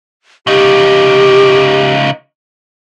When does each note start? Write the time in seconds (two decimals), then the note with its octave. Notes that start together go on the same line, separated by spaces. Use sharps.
0.47 C#3 D#4 G4